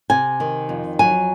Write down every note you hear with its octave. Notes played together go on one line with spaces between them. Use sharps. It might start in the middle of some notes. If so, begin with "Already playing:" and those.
C3 G#5
D#3
F2
F#3 G#5